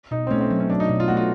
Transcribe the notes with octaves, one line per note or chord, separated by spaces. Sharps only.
B2 D#4
C4
A3 C#4
C4
F#3
C#4
F#3 D4
D#4
B2
F4
A3 F#4
F4